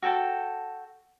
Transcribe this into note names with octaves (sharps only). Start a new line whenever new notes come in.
F#4 A4 G5 A5